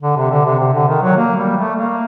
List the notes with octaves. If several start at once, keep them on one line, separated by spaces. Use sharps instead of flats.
D3
C3
D3
C3
C3
D3
D#3
F#3
A#3
G3
A3
A#3